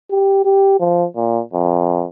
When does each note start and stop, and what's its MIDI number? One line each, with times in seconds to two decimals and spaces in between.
0.11 0.43 67
0.45 0.78 67
0.80 1.05 53
1.16 1.41 46
1.53 2.05 41